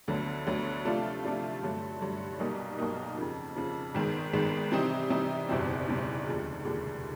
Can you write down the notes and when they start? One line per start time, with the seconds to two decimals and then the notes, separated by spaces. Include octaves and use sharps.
0.08 D2 D3 F#3 B3
0.46 D2 D3 F#3 B3
0.85 C3 F3 A3 D4 F4
1.24 C3 F3 A3 D4 F4
1.62 G2 D3 F#3 A3
2.01 G2 D3 F#3 A3
2.39 B1 B2 G3 A#3 D#4
2.79 B1 B2 G3 A#3 D#4
3.16 F2 C#3 F3
3.56 F2 C#3 F3
3.94 G#1 G#2 D#3 G#3 B3
4.33 G#1 G#2 D#3 G#3 B3
4.72 C3 E3 G3 C4 D#4
5.10 C3 E3 G3 C4 D#4
5.49 F#1 E2 B2 G3 C4
5.88 F#1 E2 B2 G3 C4
6.26 F1 D#2 D3 F3 G#3
6.65 F1 D#2 D3 F3 G#3